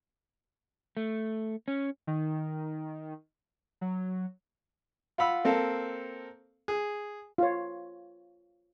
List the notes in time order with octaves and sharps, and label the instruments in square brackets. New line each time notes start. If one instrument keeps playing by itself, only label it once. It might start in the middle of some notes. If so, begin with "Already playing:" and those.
[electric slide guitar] A3
C#4
[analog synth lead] D#3
F#3
[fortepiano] F4 F5 F#5 B5 E6
A#3 C4 A4 F5
G#4
[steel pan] F4 C#5